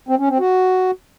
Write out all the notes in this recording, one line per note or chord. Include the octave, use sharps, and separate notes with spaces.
C4
C#4
C4
F#4